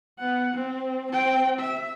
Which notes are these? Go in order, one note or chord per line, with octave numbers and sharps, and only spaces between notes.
B3 F#5
C4
C4 G5
E5